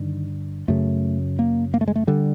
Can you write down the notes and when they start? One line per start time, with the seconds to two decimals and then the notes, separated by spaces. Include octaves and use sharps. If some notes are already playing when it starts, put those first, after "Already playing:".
Already playing: G2 D3 D#3
0.68 F#2 C#3 A3
1.39 A#3
1.74 A#3
1.81 A3
1.88 G#3
1.96 A3
2.07 D3 G3